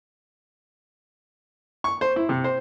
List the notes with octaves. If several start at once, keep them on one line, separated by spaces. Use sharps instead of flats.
C#6
C5
E4
C3
C5